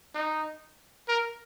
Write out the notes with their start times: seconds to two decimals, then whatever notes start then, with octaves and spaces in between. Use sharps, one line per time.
0.15 D#4
1.08 A#4